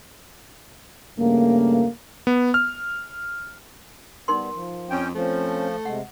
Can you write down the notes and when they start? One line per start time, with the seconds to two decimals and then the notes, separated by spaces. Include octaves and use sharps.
1.19 G2 C#3 A3 A#3
2.27 B3
2.54 F6
4.28 G3 B3 D#4 A#4 C6
4.54 F3
4.90 F2 C#4 G5
5.15 F3 A3 C4 C#4
5.85 C3 G#3 F#5